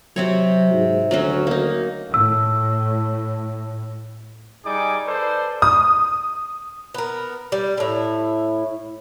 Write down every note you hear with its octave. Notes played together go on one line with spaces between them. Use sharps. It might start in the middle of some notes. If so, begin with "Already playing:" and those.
C3 F#3 C4 C#5
G#2
D2 F#3 C#4 F#4
A#3 D#4
A2 E6
G3 D#4 G#4 D5 G#5 D6
A4 B4 C5 D5
D#6
B3 A#4
G3
A2 E4